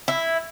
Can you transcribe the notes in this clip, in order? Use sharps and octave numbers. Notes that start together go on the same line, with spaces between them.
E4